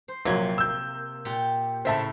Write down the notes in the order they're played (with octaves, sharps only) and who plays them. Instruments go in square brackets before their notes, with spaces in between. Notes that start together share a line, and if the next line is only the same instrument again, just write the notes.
[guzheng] C5
[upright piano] A#1 F#3 G#6 [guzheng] C3 A#3
[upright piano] E6 G6
[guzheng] A#2 G4
[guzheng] A2 C#3 [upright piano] C5 E5 A5